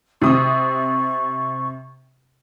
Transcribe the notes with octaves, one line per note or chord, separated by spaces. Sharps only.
C3 C#6 D#6